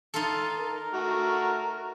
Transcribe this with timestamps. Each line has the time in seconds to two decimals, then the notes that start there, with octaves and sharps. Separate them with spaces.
0.14 D#4 F4 A4
0.58 A#4
0.93 A3 F#4